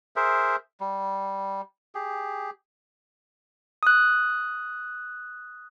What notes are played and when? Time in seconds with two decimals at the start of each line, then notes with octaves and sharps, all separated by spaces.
0.16 G#4 A#4 C5 E5
0.80 G3
1.95 G4 G#4
3.83 D#6 F#6